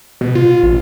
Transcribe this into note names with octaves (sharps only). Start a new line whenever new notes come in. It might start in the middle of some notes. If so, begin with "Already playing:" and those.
B2
F4
A1